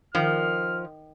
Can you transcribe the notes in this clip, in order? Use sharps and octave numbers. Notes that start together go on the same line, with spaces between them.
D#3 F3 F6